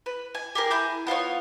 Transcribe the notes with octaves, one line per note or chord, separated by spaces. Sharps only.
B4
G#5
G4 G#4 A#4
E4 G#5 G6
B3 F4 A#4 C#5